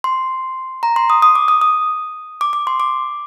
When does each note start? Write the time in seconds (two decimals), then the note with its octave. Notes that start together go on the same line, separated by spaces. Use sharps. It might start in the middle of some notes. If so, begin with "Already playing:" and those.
0.04 C6
0.83 A#5
0.96 C6
1.10 D#6
1.22 D#6
1.35 D6
1.48 D#6
1.61 D#6
2.41 D6
2.53 D6
2.67 C6
2.80 D6